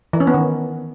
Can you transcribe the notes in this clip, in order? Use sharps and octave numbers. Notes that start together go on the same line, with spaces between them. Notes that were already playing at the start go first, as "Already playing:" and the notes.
E3
C#4
B3
D#3